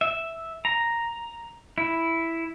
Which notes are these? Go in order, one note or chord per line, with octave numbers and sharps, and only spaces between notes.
E5
A#5
E4